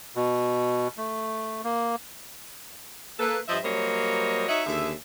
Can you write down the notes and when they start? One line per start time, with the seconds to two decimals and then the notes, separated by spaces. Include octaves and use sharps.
0.16 B2
0.97 A3
1.64 A#3
3.20 A#3 A4 B4
3.48 G2 F3 D#5 E5
3.64 F#3 G3 A#3 C5 C#5 D#5
4.49 D#4 F#4 C#5 D#5 E5
4.66 D#2 D3 G#4 E5